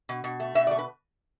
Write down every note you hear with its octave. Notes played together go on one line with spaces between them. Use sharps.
B2
B2
A3
B2 E5
D5
A3
B4